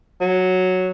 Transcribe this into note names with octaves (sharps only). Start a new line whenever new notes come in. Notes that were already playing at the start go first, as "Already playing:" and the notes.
F#3